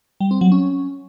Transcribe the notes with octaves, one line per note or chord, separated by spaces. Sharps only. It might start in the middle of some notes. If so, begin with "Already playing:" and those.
G3
C4
F#3
C#4